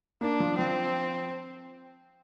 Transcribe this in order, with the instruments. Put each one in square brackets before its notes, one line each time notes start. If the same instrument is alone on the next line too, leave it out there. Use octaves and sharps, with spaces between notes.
[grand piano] A#3 [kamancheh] D4
[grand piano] F3
[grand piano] F3 [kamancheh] C4